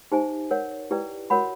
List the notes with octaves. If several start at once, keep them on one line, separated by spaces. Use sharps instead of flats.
D#4 G4 C5 E5 G#5
A#4 C#5 F#5
E4 G4 B4 D5 G5
F#4 A#4 C#5 F#5 B5